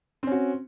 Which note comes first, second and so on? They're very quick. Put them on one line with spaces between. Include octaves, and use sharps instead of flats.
C4 C#4 F#4